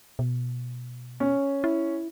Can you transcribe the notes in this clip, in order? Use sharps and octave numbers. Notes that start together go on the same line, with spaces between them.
B2
C#4
E4